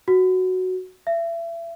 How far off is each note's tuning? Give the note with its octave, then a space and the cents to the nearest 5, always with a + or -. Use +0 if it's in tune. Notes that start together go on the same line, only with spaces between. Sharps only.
F#4 +0
E5 +30